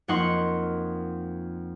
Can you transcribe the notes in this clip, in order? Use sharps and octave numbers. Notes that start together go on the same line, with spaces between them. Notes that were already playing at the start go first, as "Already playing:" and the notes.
F2 A#3 D#4 F#5 C6 C#6